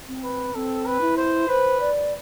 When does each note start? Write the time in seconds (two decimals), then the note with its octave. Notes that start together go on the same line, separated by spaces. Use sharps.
0.08 C4
0.24 B4
0.55 C4 A4
0.86 B4
1.01 E4
1.17 C5
1.49 B4 C5
1.80 D5